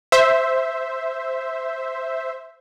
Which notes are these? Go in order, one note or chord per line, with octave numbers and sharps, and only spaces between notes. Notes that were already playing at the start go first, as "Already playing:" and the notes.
C5 E5